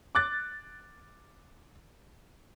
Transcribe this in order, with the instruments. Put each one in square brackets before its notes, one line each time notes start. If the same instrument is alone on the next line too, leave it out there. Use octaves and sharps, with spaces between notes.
[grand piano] D6 F#6 A6